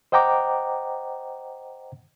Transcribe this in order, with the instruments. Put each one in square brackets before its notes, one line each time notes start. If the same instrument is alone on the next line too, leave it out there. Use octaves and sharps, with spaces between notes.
[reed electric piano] C5 D#5 F#5 G5 A#5 D6